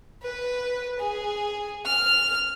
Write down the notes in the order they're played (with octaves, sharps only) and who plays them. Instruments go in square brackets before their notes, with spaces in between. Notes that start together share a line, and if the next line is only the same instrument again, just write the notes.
[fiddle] B4
G#4
F6